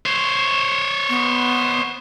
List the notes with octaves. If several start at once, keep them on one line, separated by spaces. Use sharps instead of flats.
C5 C#5
B3